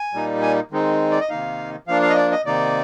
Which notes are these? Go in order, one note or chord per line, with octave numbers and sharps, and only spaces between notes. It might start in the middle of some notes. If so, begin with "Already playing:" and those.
Already playing: G#5
A#2 G3 A#3 D#4
G#5
D#3 G#3 C4 D#4
D5
D#5
C3 D#3 A#3 D#4 F5
F3 A#3 D4 F5
F5
D#5
D5
D#5
C3 D#3 A#3 D#4 D5